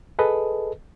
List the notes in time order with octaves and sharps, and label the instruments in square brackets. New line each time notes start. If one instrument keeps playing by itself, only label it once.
[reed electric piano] G#4 A4 B4 D#5